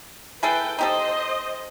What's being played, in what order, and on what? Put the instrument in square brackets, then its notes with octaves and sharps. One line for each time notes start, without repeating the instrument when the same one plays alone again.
[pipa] E4 G#4 A4 [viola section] B4 G5
[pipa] D#4 G4 A4 [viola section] C5 D#5